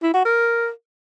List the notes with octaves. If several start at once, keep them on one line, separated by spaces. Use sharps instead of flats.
E4
F#4
A#4